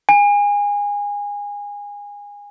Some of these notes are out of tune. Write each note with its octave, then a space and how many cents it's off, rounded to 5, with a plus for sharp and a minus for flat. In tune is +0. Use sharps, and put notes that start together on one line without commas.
G#5 -25